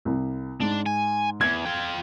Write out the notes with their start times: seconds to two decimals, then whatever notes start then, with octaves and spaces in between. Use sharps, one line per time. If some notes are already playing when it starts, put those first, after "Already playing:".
0.05 C2
0.61 G#2 D4
0.86 G#5
1.41 E2 G#6
1.66 F4 G5